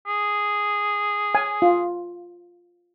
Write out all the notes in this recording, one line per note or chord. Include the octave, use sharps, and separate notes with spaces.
G#4
G#5
F4